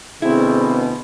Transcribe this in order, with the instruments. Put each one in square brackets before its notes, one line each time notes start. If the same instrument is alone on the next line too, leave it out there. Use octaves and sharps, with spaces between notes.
[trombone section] D2 B2 [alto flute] C4 [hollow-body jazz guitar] E4 [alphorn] G#4